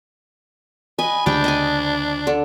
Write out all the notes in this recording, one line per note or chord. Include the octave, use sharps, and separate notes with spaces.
B4 D#5 G#5
D2 C#3 G#3 D4 G4 G5
D#5 G5 G#5
D3